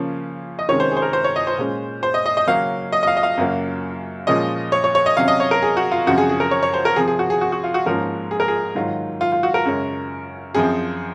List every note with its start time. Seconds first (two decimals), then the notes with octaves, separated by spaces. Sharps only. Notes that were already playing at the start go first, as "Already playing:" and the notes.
Already playing: C#3 F3 A#3 C#4
0.59 D#5
0.69 C3 D#3 G#3 C#4 C#5
0.80 C5
0.91 G#4
0.97 C5
1.02 A#4
1.13 C5
1.24 C#5
1.36 D#5
1.47 C5
1.58 A#2 G#3 C#4
2.03 C5
2.14 D#5
2.26 D#5
2.37 D#5
2.48 C#3 F#3 A#3 C#4 F5
2.92 D#5
3.03 D#5
3.07 F5
3.17 D#5
3.23 F5
3.37 F#2 C#3 F#3 A#3
4.27 A#2 F3 G#3 C#4 D#5
4.72 C#5
4.84 C#5
4.95 C#5
5.06 D#5
5.17 C3 F#3 C#4 F5
5.28 D#5
5.40 C#5
5.51 A#4
5.62 G#4
5.77 F#4
5.91 F4
6.06 F#2 C#3 F3 C4 F#4
6.18 G#4
6.29 G#4
6.40 A#4
6.51 C#5
6.63 C#5
6.74 C5
6.85 A#4
6.96 C3 F3 C4 G#4
7.08 G#4
7.19 F#4
7.30 G#4
7.41 F#4
7.52 F#4
7.64 F4
7.74 F#4
7.86 G#2 F3 A#3 C#4 A#4
8.31 G#4
8.40 A#4
8.48 G#4
8.75 G#2 D#3 F#3 F4
9.21 F4
9.32 F4
9.43 F#4
9.54 A#4
9.65 F#2 C#3 G#3 C#4
10.54 F#2 F3 C4 G#4